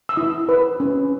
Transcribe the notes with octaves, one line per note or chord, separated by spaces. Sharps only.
E6
E4 D#6
B4
C#4